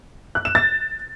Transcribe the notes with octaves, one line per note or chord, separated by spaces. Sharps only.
F#6
E7
A6